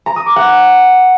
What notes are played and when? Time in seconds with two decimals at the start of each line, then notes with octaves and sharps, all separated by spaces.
0.06 A#5
0.16 D#6
0.26 D6
0.36 F#5